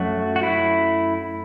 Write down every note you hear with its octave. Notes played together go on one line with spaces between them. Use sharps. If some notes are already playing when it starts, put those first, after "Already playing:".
Already playing: F#2 F#3 A3 F#4
F#4
E4